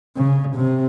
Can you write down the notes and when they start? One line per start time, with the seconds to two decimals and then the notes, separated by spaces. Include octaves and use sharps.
0.17 C#3
0.56 C3